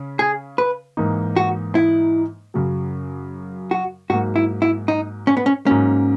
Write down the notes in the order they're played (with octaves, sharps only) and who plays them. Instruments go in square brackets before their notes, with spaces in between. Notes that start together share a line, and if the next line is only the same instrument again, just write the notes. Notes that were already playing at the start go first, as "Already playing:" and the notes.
Already playing: [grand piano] C#3 C#4
[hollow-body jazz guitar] G#4
B4
[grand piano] G#2 E3 A#3 D#4
[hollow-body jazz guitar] F#4
E4
[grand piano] F#2 C#3 F#3
[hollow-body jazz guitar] F#4
[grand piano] G#2 F#3 A#3 [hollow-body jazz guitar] F#4
[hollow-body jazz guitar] E4
E4
D#4
C#4
B3
C#4
[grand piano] G#2 F#3 A#3 [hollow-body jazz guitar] C#4